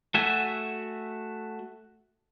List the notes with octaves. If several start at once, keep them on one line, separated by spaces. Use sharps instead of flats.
A3 F#4 E5 G#5